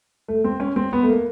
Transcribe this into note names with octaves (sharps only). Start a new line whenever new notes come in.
A3
C4
C#4
C4
B3
A3
A#3